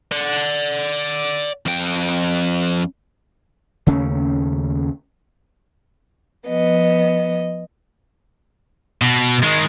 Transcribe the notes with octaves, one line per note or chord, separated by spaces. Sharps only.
D5 F#5
F2 G5
D#2 C#3 A3 C#4
F3 B3 D#5
B2
D#3 G#3